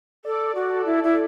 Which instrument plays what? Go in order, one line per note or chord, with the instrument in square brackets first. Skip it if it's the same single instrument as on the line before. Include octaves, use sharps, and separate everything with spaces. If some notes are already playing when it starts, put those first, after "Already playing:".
[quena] A4 [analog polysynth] D5
[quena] F#4
[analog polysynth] A4
[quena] E4
E4